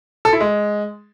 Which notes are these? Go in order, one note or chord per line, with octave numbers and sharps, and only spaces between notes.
A4
E4
G#3